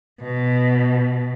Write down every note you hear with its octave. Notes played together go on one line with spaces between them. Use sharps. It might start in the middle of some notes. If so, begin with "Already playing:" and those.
B2